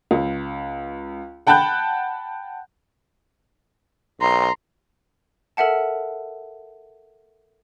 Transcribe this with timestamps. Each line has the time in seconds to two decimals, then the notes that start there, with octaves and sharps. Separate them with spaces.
0.11 C#2
1.47 F#5 G5 A5 B5 F#6 G6
4.20 B1 A#5 C6
5.57 A4 A#4 E5 F#5 A5